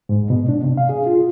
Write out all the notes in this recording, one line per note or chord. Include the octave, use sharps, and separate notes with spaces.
G#2
B2
D4
C3
F5
G#4
F4